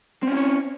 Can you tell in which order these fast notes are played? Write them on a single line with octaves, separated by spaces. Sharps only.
C4 C#4 E4 C#5